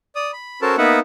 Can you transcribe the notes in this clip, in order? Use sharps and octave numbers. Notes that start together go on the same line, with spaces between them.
D5 D#6
B5
C#4 F#4 A4 A#4 C5 A5
A#3 B3 D#4 B4 E5 F#5